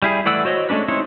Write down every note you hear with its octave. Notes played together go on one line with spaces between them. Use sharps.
G3 E4 G#4
E3 A3 D5 F#5 E6
F#4 C5 C#5 D#5
G#3 A3 C#4 D4 B4
G#3 C4 D#4 E4 C#5